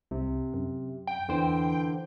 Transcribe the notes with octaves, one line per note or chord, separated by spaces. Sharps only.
C2 C3
F#2
G5
E2 D3 E3 C5